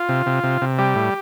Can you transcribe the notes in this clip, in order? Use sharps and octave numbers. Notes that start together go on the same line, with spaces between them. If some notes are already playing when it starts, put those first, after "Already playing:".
Already playing: F4
C3
C3
C3
C3
G3 G4
A2